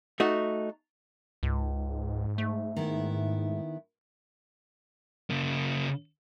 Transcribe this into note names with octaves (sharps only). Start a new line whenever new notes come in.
A3 D#4 F#4
C#2 G#2
A3
D#3 B3 E4
C#3 A#3